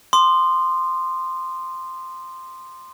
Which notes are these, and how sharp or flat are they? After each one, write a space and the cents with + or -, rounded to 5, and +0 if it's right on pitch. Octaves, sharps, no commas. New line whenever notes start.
C6 -5 D#6 -45